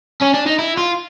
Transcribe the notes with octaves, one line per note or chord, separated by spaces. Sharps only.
C#4
D4
D#4
E4
F4